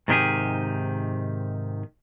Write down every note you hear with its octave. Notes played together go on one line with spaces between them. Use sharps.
G#2 C3 D#3 D4 G4 G#4